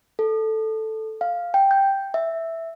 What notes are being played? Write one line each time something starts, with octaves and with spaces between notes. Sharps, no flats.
A4
F5
G5
G6
E5